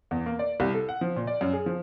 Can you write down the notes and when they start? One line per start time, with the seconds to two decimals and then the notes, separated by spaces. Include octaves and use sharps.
0.11 E2
0.26 A#3
0.39 D5
0.60 C2
0.74 A4
0.89 F#5
1.01 F3
1.16 A#2
1.27 D5
1.41 F#2
1.53 G#4
1.66 F3